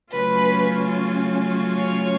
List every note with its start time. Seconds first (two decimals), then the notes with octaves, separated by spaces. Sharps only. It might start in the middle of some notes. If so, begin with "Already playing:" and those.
0.12 C#3 F#3 A3 C#4 F4 B4
1.78 C#5